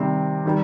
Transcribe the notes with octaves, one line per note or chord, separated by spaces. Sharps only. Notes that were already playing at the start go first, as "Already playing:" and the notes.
Already playing: C3 D#3 G3 C4
D#3 G3